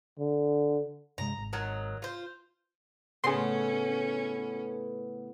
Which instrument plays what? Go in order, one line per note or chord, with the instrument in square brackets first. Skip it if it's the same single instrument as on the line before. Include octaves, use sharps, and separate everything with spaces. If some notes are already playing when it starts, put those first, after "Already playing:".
[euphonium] D3
[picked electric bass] G2 C3 G#3 [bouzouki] A#5
[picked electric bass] G#1
[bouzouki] D#3 F#3
F4 C5
[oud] A2 C#3 A3 [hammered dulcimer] B3 [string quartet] C#4 [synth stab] G#4 C6